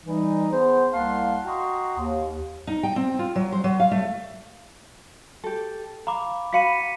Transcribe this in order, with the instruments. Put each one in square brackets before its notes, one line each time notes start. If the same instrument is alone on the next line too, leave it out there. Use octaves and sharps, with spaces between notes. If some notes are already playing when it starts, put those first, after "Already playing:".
[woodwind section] E3 G3 D#4
B3 G#4 C5
C2 A#3 F5 F#5 A5 C6
F#4 D#5 G5 A#5 C6 C#6
D#2
[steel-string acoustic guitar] D#4
G5
C4
F4
F#3
C5
F#3
F5
A3
[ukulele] G4 A4
[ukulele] F5 [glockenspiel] A#5 B5 D6
[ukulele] F#4 F5 B5 [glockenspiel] B6 C#7 D#7